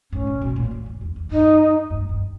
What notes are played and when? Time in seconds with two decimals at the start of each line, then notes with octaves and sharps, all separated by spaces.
0.12 G#2 C#4
0.27 B2
0.42 B2
0.56 A#2
0.71 A#2
0.86 G2
1.01 E2
1.16 E2
1.31 G2 D#4
1.90 G2
2.09 G2